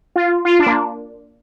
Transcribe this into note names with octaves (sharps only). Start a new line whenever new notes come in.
F4
F4
D4
A#3